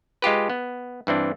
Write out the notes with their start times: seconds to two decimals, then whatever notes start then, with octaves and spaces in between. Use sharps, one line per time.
0.22 G#3 F4 G4 B4
0.50 B3
1.07 G2 E3 C4 D4